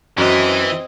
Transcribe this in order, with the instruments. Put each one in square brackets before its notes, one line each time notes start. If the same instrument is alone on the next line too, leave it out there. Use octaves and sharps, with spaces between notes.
[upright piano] F#2 [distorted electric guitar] E3 [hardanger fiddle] C4 D#5